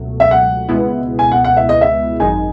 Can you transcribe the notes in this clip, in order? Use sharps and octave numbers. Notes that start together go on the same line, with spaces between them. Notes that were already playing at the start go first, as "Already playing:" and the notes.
Already playing: C#2 B2 F#3 A3
E5
F#5
C#2 B2 G#3 B3 E4
G#5
F#5
F#5
E5
D#5
E5
G#1 F#2 D#3 G#3 D#4 G#5